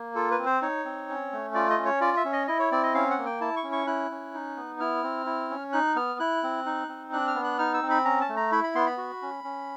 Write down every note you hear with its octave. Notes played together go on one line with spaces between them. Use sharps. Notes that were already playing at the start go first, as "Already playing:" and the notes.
Already playing: A#3
F4 A4
B4
C4
C5
D#4 C#5
C4
C#4
A3
F4 D5
D#5
C#4
C#5
F4 D5
E5
C#4
D#5
E4 D#5
C#5
C4 D5
D#5
C#4 F5
F#5
A#3
G5
E4 A5
C#6
C#4
C#6
E4 F#6
C#4
D#4
B3
E4 F6
C4
E4
C#4
D#4 F#6
B3 F6
E4 F#6
C4
D#4
C4
D4 F#6
F6
B3
F#6
D#4 F6
E6
C4
B5
C#4 A#5
A5
A3
A#5
E4 B5
B5
B3 C6
B5
F#4
C#4
C#4